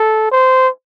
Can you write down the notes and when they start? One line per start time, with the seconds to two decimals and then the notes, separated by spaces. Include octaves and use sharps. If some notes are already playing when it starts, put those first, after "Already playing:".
Already playing: A4
0.32 C5